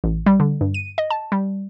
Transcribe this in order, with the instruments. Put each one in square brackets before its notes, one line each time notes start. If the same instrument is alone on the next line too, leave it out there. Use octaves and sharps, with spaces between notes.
[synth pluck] A1
G3
D3
G2
D#7
D#5
A5
G3